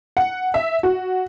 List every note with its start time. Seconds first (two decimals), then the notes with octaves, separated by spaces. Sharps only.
0.17 F#5
0.54 E5
0.83 F#4